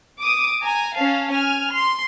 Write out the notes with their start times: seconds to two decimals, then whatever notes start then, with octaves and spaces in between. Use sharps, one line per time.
0.19 D6 D#6
0.63 G#5 A#5
0.97 C#4 F5 A5
1.33 G#5 F6
1.73 C6